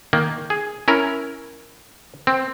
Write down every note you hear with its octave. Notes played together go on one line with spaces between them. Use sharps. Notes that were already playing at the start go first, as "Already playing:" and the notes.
D#3 A#3
G#4
C#4 E4 A#4
C4